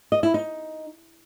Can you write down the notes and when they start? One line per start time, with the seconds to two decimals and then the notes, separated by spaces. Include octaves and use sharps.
0.12 D#5
0.23 E4
0.34 D#4